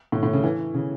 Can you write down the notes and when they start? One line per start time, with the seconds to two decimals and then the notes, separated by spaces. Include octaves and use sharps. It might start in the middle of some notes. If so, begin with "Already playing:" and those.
0.12 A2
0.23 A2
0.33 C#3
0.44 E3
0.74 C#3